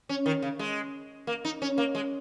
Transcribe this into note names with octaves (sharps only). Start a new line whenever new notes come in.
C#4
D#3
C#3
G#3
A#3
D#4
C#4
A#3
G#3